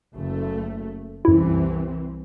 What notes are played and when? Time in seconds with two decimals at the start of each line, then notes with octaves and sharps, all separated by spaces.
0.16 F#1 A3
1.25 C2 F#2 E3 C4 E4